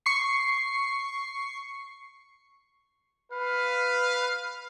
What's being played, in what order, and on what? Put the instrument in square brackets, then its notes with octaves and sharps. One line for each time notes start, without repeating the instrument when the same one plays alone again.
[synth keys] C#6 C7
[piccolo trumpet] B4 [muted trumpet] F5